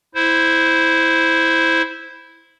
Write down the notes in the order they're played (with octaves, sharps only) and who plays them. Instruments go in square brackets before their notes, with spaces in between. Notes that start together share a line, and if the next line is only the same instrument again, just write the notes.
[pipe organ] E4 C5